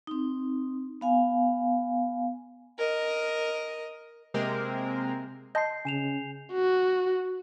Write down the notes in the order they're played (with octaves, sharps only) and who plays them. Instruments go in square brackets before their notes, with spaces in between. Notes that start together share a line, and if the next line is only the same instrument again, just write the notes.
[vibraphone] C4 D#4
B3 F5 G#5
[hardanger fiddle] A#4 D#5
[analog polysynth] C3 G#3 A#3 C4 A#4
[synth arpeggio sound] D#5 A5 C6 [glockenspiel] G6 C7
[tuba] C#3 [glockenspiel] G#5 E7 F7
[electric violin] F#4